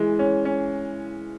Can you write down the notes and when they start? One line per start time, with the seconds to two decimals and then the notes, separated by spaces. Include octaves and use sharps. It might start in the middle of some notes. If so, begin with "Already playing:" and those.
Already playing: E3 G#3
0.19 C#4
0.45 C#4